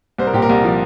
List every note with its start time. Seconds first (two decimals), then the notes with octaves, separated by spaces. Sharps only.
0.19 C2 C5
0.27 A#4
0.33 A#2 G4
0.42 A#4
0.49 C2
0.64 F3